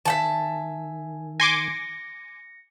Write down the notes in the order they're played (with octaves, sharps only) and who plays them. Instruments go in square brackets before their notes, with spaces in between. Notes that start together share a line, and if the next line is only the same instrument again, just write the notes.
[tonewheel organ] D#3 [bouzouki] E5 F#5 A5 [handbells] G#5
[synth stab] G#5 C6 D6 [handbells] A#6 C#7